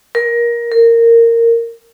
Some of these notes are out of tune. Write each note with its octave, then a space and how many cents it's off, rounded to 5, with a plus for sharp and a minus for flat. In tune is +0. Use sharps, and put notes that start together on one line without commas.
A#4 +20
A#4 -15